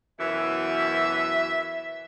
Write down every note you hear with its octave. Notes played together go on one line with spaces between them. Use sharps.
F#2 B2 E3 E5